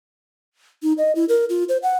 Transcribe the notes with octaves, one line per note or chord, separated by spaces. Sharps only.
D#4
D#5
E4
A#4
F4
C5
F#5